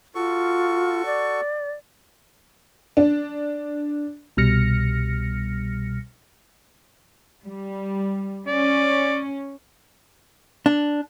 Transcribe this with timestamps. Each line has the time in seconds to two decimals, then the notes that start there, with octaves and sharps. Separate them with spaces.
0.15 F4 F#4 A4 C#6
1.06 D5
2.97 D4
4.37 C2 B2 G3 F6 A#6 C#7
7.44 G3
8.47 C#4 D5
10.66 D4